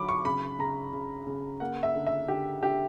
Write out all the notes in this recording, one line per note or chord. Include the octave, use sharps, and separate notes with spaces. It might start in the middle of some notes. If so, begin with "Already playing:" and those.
Already playing: D3 F#3 B5 D6
C#6
C#3 B5
C#3 A#5
C#3
C#3
A#3 F#5
E5
D3
E5
D3 G4
D3 G4